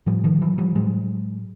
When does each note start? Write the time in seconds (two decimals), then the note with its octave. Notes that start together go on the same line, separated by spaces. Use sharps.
0.06 A2 F3 G3
0.24 D#3 F3
0.42 E3 F#3
0.58 F3 G3
0.75 A2 F#3 G#3